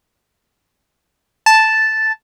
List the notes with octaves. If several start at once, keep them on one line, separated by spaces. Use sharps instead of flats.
A5